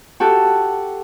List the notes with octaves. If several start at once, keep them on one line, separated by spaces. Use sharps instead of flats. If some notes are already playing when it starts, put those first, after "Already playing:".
F#4 G4 A4